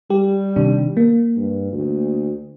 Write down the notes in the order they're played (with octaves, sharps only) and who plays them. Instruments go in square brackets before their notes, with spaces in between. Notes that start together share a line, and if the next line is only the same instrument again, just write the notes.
[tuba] G3 [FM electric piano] G4
[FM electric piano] C3 D#3 D4
A#3
[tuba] G2
D2